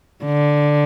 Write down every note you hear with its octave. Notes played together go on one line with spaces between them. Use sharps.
D3